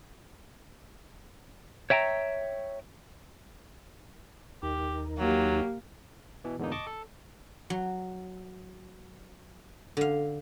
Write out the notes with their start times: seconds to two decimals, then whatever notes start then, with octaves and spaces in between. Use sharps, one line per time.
1.90 C#5 E5 G5 G#5 A#5
4.63 D#2 D#4 G4 A#4
5.19 F#3 A#3 G4
6.44 B2 E3
6.59 E2 G#2 B2 D3 A#3 D#4
6.72 D#5 A5 C#6 D6
6.87 A4
7.70 F#3
9.97 D3 F5